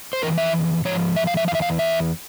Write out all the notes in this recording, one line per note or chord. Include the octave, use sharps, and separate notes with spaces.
C5
F2 E3 A#4
E5
G#2 F3 C#5
E5
F5
E5
E3 F5
E2 E5
F5
E5